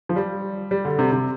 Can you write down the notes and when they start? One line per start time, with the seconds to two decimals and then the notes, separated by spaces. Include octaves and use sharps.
0.09 F3
0.16 G3
0.71 G3
0.85 D3
0.99 C3
1.12 C3